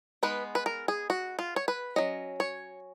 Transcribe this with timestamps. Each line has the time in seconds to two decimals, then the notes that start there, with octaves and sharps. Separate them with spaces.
0.23 G#3 B3 D#4 B4
0.55 B4
0.66 A#4
0.88 G#4
1.10 F#4
1.39 F4
1.56 C#5
1.68 B4
1.96 F#3 C#4 D#5
2.40 C#5